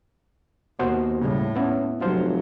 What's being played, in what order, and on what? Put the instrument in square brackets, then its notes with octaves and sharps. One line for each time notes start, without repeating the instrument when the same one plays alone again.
[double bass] D#2 [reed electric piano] B3 F#4 C5
[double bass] A2 [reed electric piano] C#3 G3
[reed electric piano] B3 E4 [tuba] C#4
[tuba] F1 [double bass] F#3 [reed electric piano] F4 C5